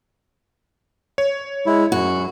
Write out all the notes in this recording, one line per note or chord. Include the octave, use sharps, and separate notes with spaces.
C#5
G#3 E4
F#2 F#4